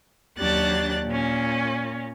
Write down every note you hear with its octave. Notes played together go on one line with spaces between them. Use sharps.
D#2 F#3 D4 G4 F#6 A6
A#2 C#4